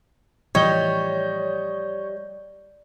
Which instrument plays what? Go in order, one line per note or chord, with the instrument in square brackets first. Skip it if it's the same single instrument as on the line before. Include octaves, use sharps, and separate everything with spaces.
[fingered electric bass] A2 E3 F3 [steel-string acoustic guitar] G3 [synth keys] C#5 G6 [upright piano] D#5